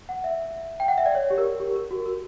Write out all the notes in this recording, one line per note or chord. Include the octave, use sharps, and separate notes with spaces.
F#5
E5
G5
F#5
E5
D5
C#5
G4
A#4
G4
A#4
F#4
A#4